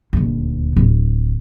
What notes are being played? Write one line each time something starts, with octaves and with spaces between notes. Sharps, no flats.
D#1 D2
D1